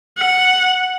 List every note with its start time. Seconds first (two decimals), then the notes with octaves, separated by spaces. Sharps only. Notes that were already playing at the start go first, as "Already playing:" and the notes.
0.18 F#5